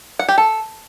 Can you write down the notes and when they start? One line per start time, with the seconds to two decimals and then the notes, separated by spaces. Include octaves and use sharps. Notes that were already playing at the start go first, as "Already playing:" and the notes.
0.19 F#5
0.29 G4
0.38 A4